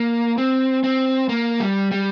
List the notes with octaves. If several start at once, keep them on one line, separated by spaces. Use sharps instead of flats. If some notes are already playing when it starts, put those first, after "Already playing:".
Already playing: A#3
C4
C4
A#3
G3
G3